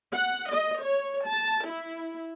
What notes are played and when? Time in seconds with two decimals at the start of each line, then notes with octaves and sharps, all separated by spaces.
0.13 F#5
0.50 D#5
0.80 C#5
1.24 A5
1.65 E4